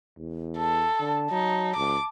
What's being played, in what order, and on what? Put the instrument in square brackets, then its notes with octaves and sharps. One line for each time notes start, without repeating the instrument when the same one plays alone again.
[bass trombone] E2
[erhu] A4 [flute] A5
[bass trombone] D3
[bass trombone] F#3 [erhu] D#4
[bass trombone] C#2 [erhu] D6